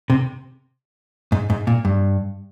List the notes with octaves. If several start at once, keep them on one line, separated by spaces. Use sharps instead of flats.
C3
G#2
G#2
A#2
G2